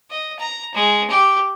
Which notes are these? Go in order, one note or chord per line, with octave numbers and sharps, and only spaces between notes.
D#5
A#5
G#3
G4